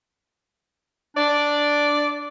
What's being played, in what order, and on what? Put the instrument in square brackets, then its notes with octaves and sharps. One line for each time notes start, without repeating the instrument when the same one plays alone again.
[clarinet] D4 [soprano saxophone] D5